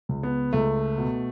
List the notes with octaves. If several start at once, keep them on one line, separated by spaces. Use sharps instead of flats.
C#2
B3
C#2 A3
B2